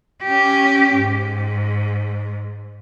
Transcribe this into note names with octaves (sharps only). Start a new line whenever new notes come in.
C#4 G4
G#2